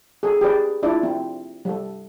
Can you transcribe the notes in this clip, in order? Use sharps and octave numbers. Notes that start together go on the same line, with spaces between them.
G#4 A4
G4 G#4 B4 D5
D4 E4 F4 D5
C4
G3 A4